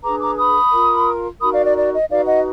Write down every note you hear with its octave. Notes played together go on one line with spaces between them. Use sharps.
D4 G#4 B4 A#5 D6
A#5 D6
B5 D#6
F4 A#4
D#4 F#4 A#4 B5 D#6
D5 F5
D5
D5
D#5
D#4 F#4 B4 D5 F5
D#5 F#5